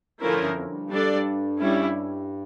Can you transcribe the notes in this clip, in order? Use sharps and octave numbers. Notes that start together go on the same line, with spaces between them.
A2 D3 F3 C#4 E4 A#4
G2
F2
G2
G3 D4 A4 D5
G3 C#4 E4